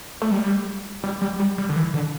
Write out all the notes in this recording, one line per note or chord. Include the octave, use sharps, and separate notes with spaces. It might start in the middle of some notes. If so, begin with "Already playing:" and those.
A3
G3
G3
G3
G3
G3
D3
E3
D3